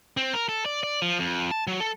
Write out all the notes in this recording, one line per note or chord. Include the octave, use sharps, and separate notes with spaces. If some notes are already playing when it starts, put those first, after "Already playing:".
C4
A#4
A4
D5
D5
F3
F2
A5
F#3
A4